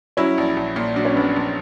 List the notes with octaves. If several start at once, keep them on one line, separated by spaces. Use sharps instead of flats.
F#3 C#4 E4
A#1
A#1
A#2
F#3 D4
C#4
A#1 B3 D4
A#1